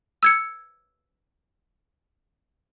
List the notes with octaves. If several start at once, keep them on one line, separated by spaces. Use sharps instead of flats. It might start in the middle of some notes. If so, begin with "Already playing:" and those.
E6 G#6 C#7